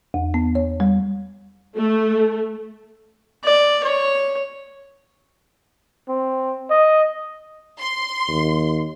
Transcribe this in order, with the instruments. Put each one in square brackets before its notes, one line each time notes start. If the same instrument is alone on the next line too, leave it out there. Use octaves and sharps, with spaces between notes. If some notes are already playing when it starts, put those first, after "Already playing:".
[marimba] E2
B3
C#5
G3
[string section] A3
[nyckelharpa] D5
C#5
[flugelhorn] C4
D#5
[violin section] C6
[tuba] D#2